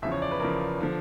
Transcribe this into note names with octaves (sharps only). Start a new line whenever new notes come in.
E2 C#3 F3 E5
C#5
D5
B4
E2 C#3 F3 A#4
D3 F3